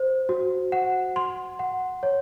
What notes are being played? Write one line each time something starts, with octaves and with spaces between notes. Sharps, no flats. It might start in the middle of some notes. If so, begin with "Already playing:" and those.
Already playing: C5
F#4
F#5
C6
F#5
C#5